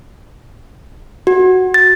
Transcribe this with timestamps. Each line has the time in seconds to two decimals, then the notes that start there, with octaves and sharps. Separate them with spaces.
1.27 F#4
1.74 A6